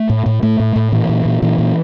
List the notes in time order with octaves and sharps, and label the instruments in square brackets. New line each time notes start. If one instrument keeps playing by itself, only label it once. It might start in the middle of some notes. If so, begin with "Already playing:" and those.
Already playing: [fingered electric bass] A3
A2
A2
A2 A3
A2
A2
A#2 E3
A#2
A#2
A#2 E3
A#2